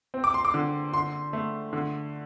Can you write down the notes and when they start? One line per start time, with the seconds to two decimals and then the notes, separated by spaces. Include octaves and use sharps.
0.14 C4
0.24 D6
0.34 C6
0.45 D6
0.54 D3
0.93 D3 C6
1.33 A3
1.73 D3